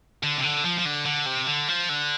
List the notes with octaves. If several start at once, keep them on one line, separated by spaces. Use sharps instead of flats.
D3
C3
D3
F3
F3
D3
D3
C3
D3
F3
D3